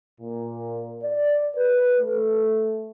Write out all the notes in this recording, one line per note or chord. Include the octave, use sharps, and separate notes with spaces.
A#2
D5
B4
A3